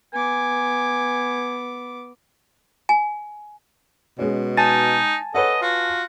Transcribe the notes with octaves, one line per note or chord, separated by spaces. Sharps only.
B3 G#5 D6
G#5
B2 G#3 C#4
D#4 G#5 A5 A6
A4 B4 C#5 D#5 F#5
F4 F#4